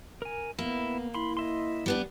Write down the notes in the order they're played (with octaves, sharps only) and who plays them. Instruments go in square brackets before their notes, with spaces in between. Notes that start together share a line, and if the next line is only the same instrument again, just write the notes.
[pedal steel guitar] A#4 G#5
[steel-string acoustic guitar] A#3 [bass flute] B3 [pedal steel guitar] E4
[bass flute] E4 [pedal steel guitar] B5 C6
[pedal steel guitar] D#5 E5 C6
[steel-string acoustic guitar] G3 B3 D4